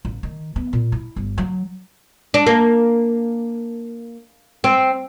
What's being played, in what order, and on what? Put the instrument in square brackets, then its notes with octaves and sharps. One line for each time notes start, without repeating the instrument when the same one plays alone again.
[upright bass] A1
D#3
B3
A#2
E4
G1
F#3
[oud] D4
A#3
C4